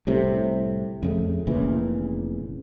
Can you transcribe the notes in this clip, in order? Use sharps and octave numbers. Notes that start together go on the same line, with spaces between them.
C2 A2 C3
F2 C#3 A3
F1 A#2 C#3 E3